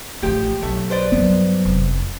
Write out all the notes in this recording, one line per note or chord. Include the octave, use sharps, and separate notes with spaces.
A1 F3 A3 G4
B1 A3
B4 C5 D5
G2 F#3 B3
F1